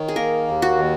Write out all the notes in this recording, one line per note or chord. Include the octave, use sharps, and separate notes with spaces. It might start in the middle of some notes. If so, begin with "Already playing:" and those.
Already playing: D#3 C#5
G#4
A#3 A#4
D#2
F#4
D#3